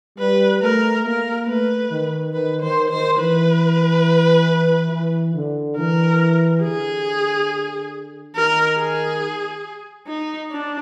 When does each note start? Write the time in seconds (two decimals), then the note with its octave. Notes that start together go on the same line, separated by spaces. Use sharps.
0.18 G3 B4
0.61 A3 A#4
1.04 A#3 A#4
1.47 A3 B4
1.90 D#3
2.34 D#3 B4
2.62 D#3 C5
2.90 D#3 C5
3.19 E3 B4
4.91 E3
5.34 D3
5.77 E3 A#4
6.63 D3 G#4
8.35 D#3 A#4
8.78 G#4
10.07 D#4
10.51 D4